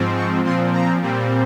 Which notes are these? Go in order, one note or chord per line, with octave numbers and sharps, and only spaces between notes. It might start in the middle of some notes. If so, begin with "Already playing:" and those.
Already playing: G#2 F3 C4
C#6
A#2 F3 C4 C6
A#5
A#2 G3 C4